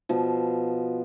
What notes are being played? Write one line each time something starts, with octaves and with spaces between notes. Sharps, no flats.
B2 F3